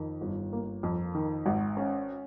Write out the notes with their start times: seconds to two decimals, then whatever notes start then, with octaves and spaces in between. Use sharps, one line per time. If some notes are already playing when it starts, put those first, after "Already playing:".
Already playing: F2 D#3
0.21 G1
0.52 A#3
0.83 F2
1.14 D#3
1.46 G#1
1.77 C#4